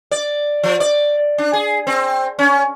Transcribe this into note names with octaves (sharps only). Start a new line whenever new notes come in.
D5
F3
D5
D4
G#4
C4
C#4